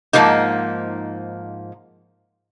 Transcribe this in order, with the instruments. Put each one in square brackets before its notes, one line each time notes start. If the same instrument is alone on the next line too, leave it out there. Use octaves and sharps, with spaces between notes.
[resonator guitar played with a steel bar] G#2 B2 F3 A#3 D#4